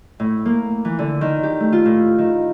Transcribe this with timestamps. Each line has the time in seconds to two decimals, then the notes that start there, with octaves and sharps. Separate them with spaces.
0.20 A2
0.45 A#3
0.85 E3
0.99 D3
1.21 D#3
1.43 G4
1.60 A3
1.73 F4
1.85 A2
2.18 D#3